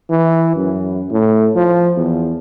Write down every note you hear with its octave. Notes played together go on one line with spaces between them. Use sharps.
E3
F#2
A2
F3
E2